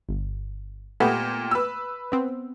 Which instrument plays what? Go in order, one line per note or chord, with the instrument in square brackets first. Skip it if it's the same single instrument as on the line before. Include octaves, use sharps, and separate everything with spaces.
[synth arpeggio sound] G1
[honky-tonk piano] A#2 G4 [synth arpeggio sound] A3 B3
[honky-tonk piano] B4 E6
[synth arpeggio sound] B3 C4